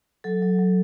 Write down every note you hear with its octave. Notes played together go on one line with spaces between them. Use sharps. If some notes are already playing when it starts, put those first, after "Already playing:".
F#3 A4
F#3
F#3